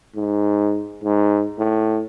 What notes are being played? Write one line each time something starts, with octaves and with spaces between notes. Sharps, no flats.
G#2
G#2
A2